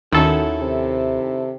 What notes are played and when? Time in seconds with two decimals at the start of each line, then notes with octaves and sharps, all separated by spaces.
0.12 D#2 D#3 C#4 E4 F#4 A4
0.61 C3